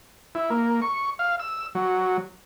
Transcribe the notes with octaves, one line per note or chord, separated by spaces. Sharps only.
E4
A#3
C#6
F5
E6
F#3